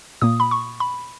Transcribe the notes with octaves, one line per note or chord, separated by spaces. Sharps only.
A#2 A#3 D#6
B5
C#6
B5